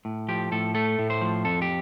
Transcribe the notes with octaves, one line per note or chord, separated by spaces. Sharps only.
A2
F3 G4
A2 A4
A3 A4
A2
C5
F3
F2 A4
G4